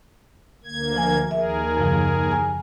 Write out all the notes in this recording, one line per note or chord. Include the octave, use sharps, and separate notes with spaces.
D2 A#3 G#6
F3 G#5
D#2 G#4 A#4 E5
F#2 C#3 F3
G#5